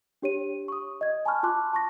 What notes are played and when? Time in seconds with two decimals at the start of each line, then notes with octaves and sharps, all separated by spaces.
0.22 D4 G4 C#5 D#7
0.68 C#6 D#6
1.01 D#5 G#6
1.25 G#5 A5 B5 C#6 F6 F#6
1.43 F4 A5 C6 D6 F#6
1.73 A5 C#6 A#6